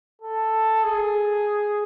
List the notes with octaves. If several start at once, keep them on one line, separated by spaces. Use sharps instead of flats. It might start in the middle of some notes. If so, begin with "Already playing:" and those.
A4
G#4